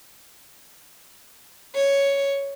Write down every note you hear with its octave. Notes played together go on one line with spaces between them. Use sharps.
C#5